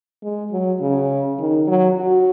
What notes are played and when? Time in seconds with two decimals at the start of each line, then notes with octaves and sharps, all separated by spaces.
0.23 G#3
0.52 F#3
0.81 C#3
1.39 D#3
1.68 F#3
1.97 F#4